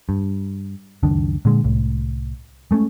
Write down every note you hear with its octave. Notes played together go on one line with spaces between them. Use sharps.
G2
C#2 F#2 D#3 D4
A#2 D3 G#3
C2 A2
G#3 A3 C4 C#4